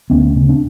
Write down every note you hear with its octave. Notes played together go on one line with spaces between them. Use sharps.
D2 B3 C#4
C#3
C4 D4